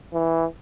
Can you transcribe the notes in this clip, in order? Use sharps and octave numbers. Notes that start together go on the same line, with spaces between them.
E3